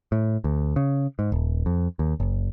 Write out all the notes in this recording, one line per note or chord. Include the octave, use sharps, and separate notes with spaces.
A2
D2
C#3
G#2
D#1
F2
D#2
F#1